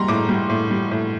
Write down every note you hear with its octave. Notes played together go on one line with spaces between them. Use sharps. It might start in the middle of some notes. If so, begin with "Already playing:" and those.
Already playing: G3 A#5 C6
A2 D6
G3
A2
G3
A2